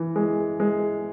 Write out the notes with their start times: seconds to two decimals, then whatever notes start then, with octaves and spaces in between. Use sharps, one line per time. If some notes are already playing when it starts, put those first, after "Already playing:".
Already playing: E3
0.16 G#3
0.60 G#3